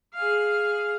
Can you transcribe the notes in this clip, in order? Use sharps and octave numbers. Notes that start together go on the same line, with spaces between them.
G#4 F5